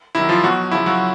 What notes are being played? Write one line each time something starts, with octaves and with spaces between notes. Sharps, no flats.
C3 D#3 F#3 E4
F3 F4
B2 F#3 F#4
C#3 F3 E4
F#3 F#4